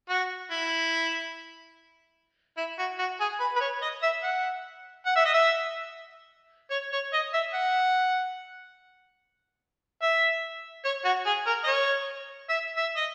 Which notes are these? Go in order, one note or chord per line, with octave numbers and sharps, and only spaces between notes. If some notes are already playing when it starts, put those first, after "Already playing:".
F#4
E4
E4
F#4
F#4
G#4
B4
B4
C#5
D#5
E5
F#5
F#5
E5
D#5
E5
C#5
C#5
D#5
E5
F#5
E5
C#5
F#4
G#4
A#4
D#5
C#5
E5
E5
D#5